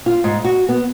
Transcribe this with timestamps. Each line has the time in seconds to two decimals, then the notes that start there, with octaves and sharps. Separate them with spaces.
0.06 F4
0.24 G#2
0.44 F#4
0.69 B3